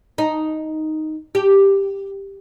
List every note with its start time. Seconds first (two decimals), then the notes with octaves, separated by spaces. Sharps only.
0.18 D#4
1.35 G4